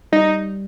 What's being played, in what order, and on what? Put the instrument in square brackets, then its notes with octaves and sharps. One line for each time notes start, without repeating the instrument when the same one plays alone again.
[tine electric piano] G3 [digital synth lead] D#4